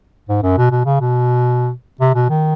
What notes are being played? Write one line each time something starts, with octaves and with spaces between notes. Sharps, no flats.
G#2
F#2
B2
B2
C#3
B2
C3
B2
D#3